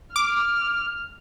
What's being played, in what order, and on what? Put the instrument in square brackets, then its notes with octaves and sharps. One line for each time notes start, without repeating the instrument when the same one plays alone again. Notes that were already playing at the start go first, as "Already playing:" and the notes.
[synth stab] D6 [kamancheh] F6